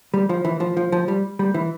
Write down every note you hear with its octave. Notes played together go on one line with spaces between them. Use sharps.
G3
F3
E3
F3
F3
F3
G3
G3
E3